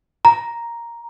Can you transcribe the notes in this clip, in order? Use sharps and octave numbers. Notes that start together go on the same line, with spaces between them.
A#5